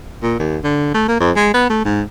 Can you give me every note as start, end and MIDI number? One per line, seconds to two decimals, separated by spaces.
0.23 0.39 46
0.39 0.58 39
0.64 0.92 50
0.94 1.07 57
1.08 1.19 58
1.20 1.31 41
1.36 1.51 56
1.54 1.68 59
1.70 1.83 57
1.85 2.02 44